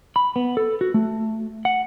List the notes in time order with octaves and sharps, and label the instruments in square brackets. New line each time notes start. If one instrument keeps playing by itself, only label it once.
[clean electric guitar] B5
B3
A4
F#4
A3
F#5